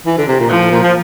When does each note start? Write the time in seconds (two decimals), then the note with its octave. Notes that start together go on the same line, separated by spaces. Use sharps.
0.06 E3
0.18 D3
0.27 C3
0.39 A#2
0.50 A2 F3
0.62 A2
0.71 A#2
0.83 F3